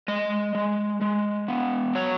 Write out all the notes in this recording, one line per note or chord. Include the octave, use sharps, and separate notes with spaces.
G#3 D#5
G#3
G#3
B3
F#3 C#5